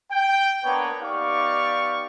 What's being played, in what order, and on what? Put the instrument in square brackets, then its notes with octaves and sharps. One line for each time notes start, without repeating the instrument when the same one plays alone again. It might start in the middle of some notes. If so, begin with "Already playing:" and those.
[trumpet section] G5
A#3 B3 D4 B4 C#5 F#5
B3 D#4 G4 D5 F5 C#6